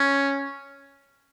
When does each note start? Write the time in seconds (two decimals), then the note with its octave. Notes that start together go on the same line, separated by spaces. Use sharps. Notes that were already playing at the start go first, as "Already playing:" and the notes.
Already playing: C#4